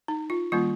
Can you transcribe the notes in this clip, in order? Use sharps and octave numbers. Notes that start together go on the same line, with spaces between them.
D#4
F4
D#3 G3 A#3 C#4 F4